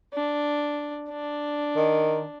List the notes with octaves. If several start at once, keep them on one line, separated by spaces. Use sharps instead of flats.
D4
D4
D#3